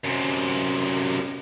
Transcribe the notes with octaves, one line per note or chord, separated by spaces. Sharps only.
F#2 C3